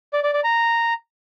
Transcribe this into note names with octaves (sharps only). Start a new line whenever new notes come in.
D5
D5
D5
A#5